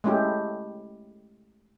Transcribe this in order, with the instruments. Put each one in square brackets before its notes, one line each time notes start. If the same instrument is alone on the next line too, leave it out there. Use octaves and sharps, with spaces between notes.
[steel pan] G#3 A3 C#4 E4 G4